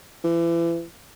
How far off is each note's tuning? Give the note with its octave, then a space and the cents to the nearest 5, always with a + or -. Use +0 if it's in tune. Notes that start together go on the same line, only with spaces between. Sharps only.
E3 +35